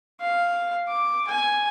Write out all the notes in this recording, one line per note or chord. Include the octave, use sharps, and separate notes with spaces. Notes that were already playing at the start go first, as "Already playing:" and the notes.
F5
D6
G#5